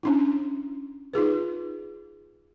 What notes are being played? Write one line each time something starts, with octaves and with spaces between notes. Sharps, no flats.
C#4 D4 E4
D#4 F4 G#4 B4